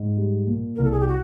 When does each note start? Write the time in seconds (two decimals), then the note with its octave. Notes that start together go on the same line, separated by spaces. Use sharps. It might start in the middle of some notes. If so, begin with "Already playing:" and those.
Already playing: G#2
0.17 G3
0.47 A#2
0.76 C2 A#4
0.84 A4
0.92 G#4
1.00 G4
1.08 F#4